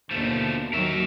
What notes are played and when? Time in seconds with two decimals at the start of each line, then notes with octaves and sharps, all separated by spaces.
0.11 D#2 B2 D3 F3 A3
0.73 D#2 D#3 F#3 A#4 E5